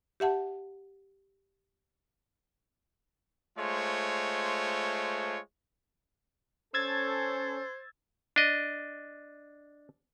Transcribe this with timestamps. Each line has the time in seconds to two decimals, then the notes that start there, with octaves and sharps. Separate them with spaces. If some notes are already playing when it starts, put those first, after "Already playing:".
0.20 G4 E5 F#5 A5
3.59 G#3 A3 F4 C5 C#5
6.74 C#4 A4 C5 E6 G#6 A6
8.36 D4 D#5